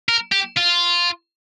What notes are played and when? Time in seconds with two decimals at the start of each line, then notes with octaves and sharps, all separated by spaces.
0.09 A#4
0.32 G4
0.57 F4